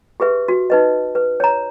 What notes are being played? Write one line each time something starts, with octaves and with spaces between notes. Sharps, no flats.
G4 G#4 B4 E5
F#4
D#4 B4 D#5
B4
C#5 A#5